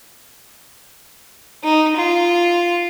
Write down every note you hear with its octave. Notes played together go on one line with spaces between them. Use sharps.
D#4
F4